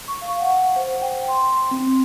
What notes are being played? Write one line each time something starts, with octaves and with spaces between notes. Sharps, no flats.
C#6
F5
F#5
C5
G5
C6
C4